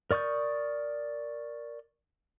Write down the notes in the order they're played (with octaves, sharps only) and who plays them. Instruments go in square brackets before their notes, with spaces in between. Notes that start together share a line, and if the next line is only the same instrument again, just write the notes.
[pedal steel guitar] A#4 D5 C#6 D#6 G6